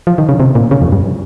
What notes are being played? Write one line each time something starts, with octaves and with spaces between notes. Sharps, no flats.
F3
D#3
C#3
C3
A#2
C#3
F2
G2